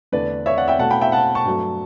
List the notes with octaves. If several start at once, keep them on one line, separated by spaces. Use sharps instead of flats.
E2 D3 A3 B4 D5
C#5 E5
D5 F#5
E5 G5
B2 A3 F#5 A5
G5 B5
E5 G5
F#5 A5
A5 C#6
G2 F#3 A3